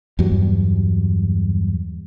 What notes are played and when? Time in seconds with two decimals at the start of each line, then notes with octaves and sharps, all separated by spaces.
0.19 E2 G2 F#3 G3